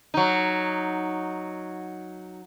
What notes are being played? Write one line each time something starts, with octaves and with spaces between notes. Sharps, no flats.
F#3 D#4